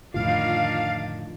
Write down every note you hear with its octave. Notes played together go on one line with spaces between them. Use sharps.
F2 A2 D3 D#3 D4 F4 F5